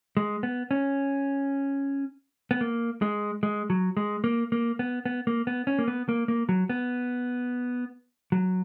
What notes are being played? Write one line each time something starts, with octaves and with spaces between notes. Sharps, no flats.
G#3
B3
C#4
B3
A#3
G#3
G#3
F#3
G#3
A#3
A#3
B3
B3
A#3
B3
C#4
A#3
B3
A#3
A#3
F#3
B3
F#3